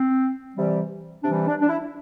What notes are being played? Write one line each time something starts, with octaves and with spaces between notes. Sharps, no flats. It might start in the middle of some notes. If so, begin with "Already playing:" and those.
Already playing: C4
C3 E3 G3
C3 E3 G3 D4
D4
D4
E4